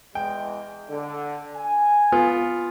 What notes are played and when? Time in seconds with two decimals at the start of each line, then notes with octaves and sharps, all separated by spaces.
0.15 E2 G#3 G5
0.90 D3
1.56 G#5
2.12 B3 F4